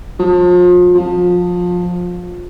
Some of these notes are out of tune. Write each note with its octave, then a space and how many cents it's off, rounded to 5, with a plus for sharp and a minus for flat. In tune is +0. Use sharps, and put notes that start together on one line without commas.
F3 +35
F3 +25